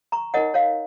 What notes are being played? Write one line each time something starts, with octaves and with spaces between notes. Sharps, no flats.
A#5 C#6
D#4 A#4 C#5 D#5 F#5
C#5 F5